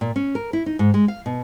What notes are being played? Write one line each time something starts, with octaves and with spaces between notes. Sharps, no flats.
A#2
C#4
A#4
E4
D#4
G#2
G#3
F5
B2